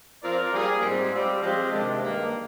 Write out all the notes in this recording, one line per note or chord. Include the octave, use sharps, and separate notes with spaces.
F3 C4 F4 A#4 D5
G3 A#3 F4 G#4
G#2 G3 C4
G3 C4 F4
F3 G#3 C4 G4
C3 D#3 G#3 D4
G2 D#3 A#3